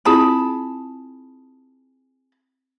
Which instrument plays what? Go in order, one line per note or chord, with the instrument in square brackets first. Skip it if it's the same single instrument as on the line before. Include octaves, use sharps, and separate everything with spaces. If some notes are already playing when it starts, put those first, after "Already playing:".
[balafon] C4 E4 F4 [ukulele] G#4 A5 B5